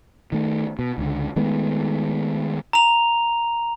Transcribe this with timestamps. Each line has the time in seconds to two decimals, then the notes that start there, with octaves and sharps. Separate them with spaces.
0.32 D#3 A3
0.79 B2
0.98 C#2 D3
1.36 D#3 G#3 A3 B3
2.73 A#5 F7